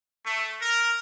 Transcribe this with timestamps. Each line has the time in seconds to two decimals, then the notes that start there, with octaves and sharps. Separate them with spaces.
0.25 A3
0.61 A#4